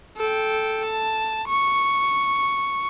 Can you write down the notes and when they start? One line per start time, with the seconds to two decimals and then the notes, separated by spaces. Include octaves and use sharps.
0.17 A4 G5
0.85 A5
1.48 C#6